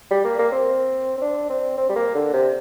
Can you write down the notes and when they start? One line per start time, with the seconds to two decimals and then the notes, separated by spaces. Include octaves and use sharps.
0.11 G3
0.24 A#3
0.39 A#3
0.52 C4
1.17 C4
1.21 D4
1.50 C4
1.77 C4
1.89 G3
1.96 A#3
2.15 D3
2.33 C3